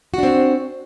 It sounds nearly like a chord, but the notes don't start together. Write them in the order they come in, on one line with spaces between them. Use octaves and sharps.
F#4 D4 C4